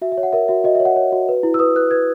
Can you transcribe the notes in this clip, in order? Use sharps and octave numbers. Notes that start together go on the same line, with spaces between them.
F#4 E5
E5
C#5
F#5
A#4 E5
F#4 E5
F#4 D#5
C#5 E5
F#5
C#5
F#4
B4
E4
E6
B4 D#6
B4 F#6
B4 G#6